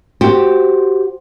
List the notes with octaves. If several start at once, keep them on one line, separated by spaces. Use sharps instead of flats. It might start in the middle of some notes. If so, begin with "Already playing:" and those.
F#4 G4 C5